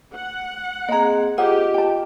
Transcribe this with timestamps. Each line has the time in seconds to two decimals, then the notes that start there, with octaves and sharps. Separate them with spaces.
0.14 F#5
0.89 A#3 C4 G#4 D#5 A#5
1.38 F4 G4 G#4 C5 D#5 F#5
1.74 G5 A5